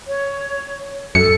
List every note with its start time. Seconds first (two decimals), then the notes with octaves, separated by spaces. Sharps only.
0.08 C#5
1.15 F#2 A4 C#7